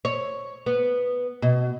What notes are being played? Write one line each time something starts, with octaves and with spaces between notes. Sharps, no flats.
C#5
B3
B2